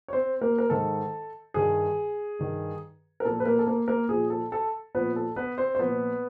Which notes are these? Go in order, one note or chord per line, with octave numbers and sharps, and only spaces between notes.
C#5
C4 C5
A#3 A#4
A#4
G#2 D#3 A4
G2 D#3 G#4
G2 D#3
A#4
A#2 F3 A4
B4
A#3 A#4
A4
A#3 A#4
A#3 A#4
A#2 F3 G#4
A4
A4
A#2 F3 B3 B4
A4
B3 B4
C4 C5
C5
A#2 F3 B3 B4